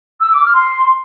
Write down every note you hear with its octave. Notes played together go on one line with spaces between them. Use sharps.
E6
D6
F6
C6